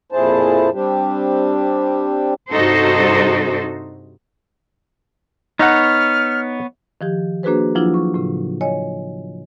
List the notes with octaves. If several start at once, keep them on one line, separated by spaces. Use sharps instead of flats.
F2 A#2 E4 G#4 C5 A5
G3 C4 D4 G4
G2 C3 D#4 F#4 A4 C5
B3 D#4 C#5 F#5 F6
D#3 F3 G4
A#3 D4 F#4 G#4 B4 C5
F3 F#3 D4 E4 F4
C#6
A2 C#3
C#5 D#5 G#5